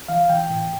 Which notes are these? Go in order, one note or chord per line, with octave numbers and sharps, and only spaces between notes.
E3 F5
E3 G5
A2